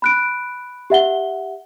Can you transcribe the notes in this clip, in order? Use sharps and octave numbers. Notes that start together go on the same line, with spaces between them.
B5 F#6 D7
G4 E5 F#5 G7